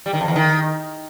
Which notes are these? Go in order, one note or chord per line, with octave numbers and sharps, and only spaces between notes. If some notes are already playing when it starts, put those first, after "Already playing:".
G3
D#3
F2
E2
D#3